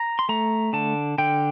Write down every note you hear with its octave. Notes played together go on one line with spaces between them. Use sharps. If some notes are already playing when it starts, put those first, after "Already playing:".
Already playing: A#5
C6
A3 A#5
D3 A5
D3 G5